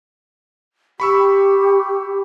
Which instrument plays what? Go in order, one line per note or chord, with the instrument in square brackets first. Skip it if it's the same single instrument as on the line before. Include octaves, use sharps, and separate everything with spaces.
[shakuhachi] G4 [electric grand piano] B5 C#6 E6